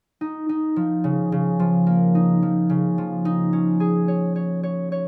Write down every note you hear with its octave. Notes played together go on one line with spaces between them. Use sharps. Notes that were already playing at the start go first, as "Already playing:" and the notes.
D#4
D#4
F3
C#3
C#3
F3
A#3
D#4
F3
C#3
F3
D#4
C#4
G#4
C#5
C#5
C#5
C#5